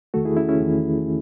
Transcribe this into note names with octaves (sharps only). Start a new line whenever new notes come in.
E2 D#3 A3 F#4 A4
E4 G#4
C#4 E4
C#4 E4
E2 D#3 A3